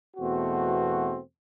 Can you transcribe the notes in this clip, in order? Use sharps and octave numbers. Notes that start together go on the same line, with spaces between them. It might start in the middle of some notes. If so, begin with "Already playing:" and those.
E2 B2 A3 C4 F#4